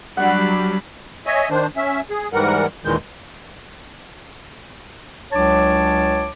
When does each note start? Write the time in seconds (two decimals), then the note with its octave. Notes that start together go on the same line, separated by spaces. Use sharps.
0.17 F#3 G3 D4 F#5 B5
1.26 C#5 D#5 E5 G#5
1.50 D#3 D4 C5
1.77 C#4 E5
2.10 G#4
2.33 G#2 E3 G3 A#4 F#5
2.85 D#2 A#2 D#3 E3 G#3 G6
5.32 C#2 F#3 D4 C#5 A5 D6